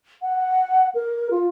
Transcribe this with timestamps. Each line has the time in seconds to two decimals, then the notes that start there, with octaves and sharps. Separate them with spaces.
0.22 F#5
0.95 A#4
1.31 F4